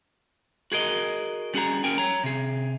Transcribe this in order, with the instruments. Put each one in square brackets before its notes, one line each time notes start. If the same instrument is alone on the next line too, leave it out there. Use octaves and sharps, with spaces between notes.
[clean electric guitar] F#4 G#4 A#4 D#5
G3 C#4 F#4 G#4 A#5
C#4 A#4 G5 G#5
C#5 A#5
C3 G#4